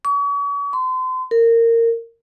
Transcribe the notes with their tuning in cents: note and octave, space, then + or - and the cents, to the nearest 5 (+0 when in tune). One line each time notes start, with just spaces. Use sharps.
C#6 +40
C6 -35
A#4 -20